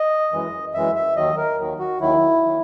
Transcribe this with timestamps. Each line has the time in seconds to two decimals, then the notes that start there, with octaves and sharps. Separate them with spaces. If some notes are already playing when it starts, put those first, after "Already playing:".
Already playing: D#5
0.32 F#2 E3 G#3
0.74 F#2 E3 G#3 E5
0.95 E5
1.16 D#2 D#3 F#3 D#5
1.37 A#4
1.59 D#2 D#3 F#3
1.79 F#4
2.01 D#2 D#3 F#3 E4
2.45 D#3 F#3